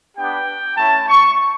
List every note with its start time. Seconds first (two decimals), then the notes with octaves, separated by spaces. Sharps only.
0.17 B3 D4 G4 G5
0.77 A3 C#4 E4 A5
1.08 C#6